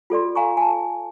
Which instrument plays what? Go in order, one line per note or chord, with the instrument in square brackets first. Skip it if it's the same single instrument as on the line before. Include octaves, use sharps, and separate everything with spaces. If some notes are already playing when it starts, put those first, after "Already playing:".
[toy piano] F4 A4 D5 C6
F5 G#5 A#5 C#6
G#5 A5